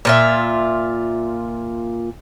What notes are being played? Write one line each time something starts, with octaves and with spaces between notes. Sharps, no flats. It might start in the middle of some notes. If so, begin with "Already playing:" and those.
A#2 F4 E5